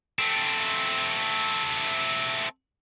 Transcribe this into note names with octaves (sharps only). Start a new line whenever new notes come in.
A3 C4